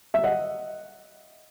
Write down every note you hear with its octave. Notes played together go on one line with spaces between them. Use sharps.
E5
D#5 F#5